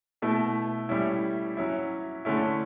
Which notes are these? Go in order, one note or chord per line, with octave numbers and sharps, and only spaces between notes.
B2 A3 E4
A2 G3 C#4 E4
F#3 C#4 E4
D3 A3 C#4 E4